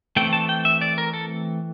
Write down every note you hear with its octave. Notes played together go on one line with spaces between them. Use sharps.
E3 A3 C4 G5
A5
G5
E5
D5
A#4
A4